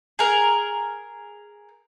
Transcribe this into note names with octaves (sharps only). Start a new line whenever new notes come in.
G#4 A#4